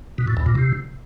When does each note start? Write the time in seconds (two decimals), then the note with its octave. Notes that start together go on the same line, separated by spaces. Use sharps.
0.18 B2
0.27 A2
0.37 E2
0.46 A#2
0.55 C3